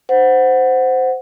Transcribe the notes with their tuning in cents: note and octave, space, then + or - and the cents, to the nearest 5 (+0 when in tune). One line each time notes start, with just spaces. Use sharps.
C5 -10 F#5 +0